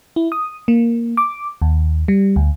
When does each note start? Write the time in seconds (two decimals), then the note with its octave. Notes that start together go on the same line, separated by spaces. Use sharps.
0.16 E4
0.32 D#6
0.68 A#3
1.17 D6
1.62 D#2
2.08 G3
2.36 D2